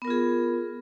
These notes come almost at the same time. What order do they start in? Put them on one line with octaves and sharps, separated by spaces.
B3 A#4 F4 G#4